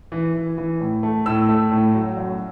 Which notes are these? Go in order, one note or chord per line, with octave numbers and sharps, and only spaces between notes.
E3
E3
E3
A2
A3
A2 E6
A3
A2
F#3
F#2